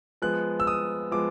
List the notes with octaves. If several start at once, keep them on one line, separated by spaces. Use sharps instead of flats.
F3 G#3 B3 F#6
E6
D#6
F3 G#3 B3 D6